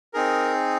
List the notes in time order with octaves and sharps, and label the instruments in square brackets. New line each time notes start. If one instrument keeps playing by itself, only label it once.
[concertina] C4 D#4 G#4 A#4